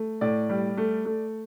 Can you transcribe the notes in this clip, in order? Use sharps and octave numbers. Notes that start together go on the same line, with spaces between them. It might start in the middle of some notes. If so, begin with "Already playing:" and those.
Already playing: A3
A2 D5
G3
A3
A3